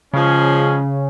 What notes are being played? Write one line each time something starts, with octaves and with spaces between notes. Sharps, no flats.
C#3 F3 G#3 C#4